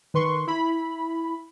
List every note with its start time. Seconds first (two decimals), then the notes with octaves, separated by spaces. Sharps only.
0.14 D#3 B4 C6 C#6
0.47 E4 B5